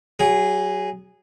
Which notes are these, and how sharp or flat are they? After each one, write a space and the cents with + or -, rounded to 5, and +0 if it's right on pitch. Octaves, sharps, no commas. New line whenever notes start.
F#3 +25 G#4 -10